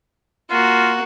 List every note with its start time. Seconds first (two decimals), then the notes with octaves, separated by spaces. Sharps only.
0.50 A#3 F4 F#4